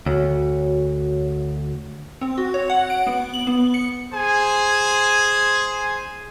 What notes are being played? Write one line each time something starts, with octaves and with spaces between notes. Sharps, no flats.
D2 F#4 C#5
C4
F#4
C#5
F#5
D7
B3
F#7
B3
C#7
G#4 C5 G#5